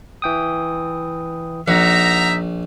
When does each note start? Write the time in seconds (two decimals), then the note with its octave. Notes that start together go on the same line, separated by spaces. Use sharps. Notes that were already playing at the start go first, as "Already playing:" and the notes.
0.22 E3 G5 D#6
1.68 A#1 D#4 E5 F#5 A#5